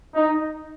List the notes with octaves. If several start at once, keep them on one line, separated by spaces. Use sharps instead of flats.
D#4